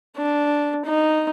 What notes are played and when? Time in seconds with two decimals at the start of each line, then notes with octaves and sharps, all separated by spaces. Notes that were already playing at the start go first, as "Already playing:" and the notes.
0.17 D4
0.86 D#4